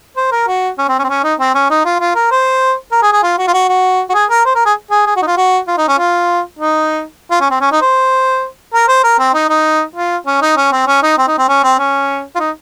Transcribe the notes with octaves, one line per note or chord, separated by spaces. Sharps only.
C5
A#4
F#4
C#4
C4
C#4
C4
C#4
D#4
C4
C#4
D#4
F4
F4
A#4
C5
A#4
G#4
G#4
F4
F#4
F4
F#4
F#4
F#4
G#4
A#4
C5
A#4
G#4
G#4
G#4
F#4
D#4
F4
F#4
F4
D#4
C#4
F4
D#4
F4
C#4
C4
C#4
D#4
C5
A#4
C5
A#4
C4
D#4
D#4
F4
C#4
D#4
C#4
C4
C#4
D#4
C4
D#4
C4
C#4
C4
C#4
F4
D#4